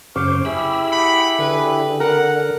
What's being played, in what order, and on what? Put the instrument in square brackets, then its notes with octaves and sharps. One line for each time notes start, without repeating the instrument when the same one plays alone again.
[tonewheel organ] F#2 C#3 C5 [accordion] C#6 F6 [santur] D6
[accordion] E4 G4 G#4 [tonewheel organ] B5 E6
[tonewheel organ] F#5 G5 [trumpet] B5
[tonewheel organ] D3 [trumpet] B4
[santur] A#4 [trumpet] F#5